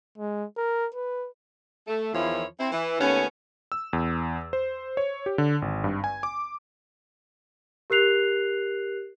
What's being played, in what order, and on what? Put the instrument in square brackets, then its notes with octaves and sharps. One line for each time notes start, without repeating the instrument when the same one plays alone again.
[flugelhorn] G#3
A#4
B4
[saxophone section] A3
E2 D#3 F3 E4 F4 C#5
C4 E4
E3
D#2 A3 B3 C#4
[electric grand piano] E6
E2
C5
C#5
G4
D3
G#1
G2
G#5
D6
[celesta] G4 A#4 F#6 C7 F7